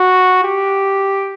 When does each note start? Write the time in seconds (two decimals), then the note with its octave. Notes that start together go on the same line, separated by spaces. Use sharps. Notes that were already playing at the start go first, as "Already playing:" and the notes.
Already playing: F#4
0.43 G4